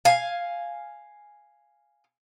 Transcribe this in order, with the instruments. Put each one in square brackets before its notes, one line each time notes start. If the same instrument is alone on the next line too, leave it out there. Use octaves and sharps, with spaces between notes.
[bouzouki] F5 G#5